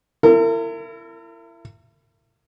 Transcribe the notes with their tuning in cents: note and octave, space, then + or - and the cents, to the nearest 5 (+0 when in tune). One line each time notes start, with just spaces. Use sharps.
E4 +30 A#4 -40